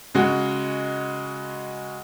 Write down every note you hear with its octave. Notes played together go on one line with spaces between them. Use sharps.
C#3 G#3 F#4